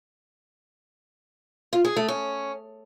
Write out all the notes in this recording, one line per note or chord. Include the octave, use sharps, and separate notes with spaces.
F4
G#4
A3
C#4